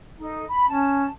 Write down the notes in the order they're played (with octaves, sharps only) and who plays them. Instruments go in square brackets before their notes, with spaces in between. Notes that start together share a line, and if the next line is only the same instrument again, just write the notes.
[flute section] D#4 A4
B5
[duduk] C#4 [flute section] A5